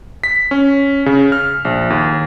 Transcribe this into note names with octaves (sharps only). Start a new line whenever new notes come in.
B6
C#4
C#3
F6
A#1
D#2